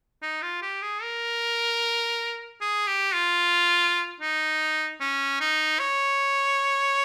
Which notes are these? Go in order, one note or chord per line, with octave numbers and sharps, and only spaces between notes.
D#4
F4
G4
G#4
A#4
G#4
G4
F4
D#4
C#4
D#4
C#5